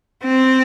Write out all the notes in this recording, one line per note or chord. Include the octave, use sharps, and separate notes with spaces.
C4